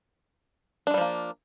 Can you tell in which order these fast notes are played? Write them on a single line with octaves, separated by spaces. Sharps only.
D4 G#3 G3 F3 A#3